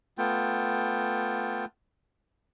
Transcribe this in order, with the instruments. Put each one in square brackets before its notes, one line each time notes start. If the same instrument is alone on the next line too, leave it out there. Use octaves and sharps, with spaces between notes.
[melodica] A3 B3 F4 G5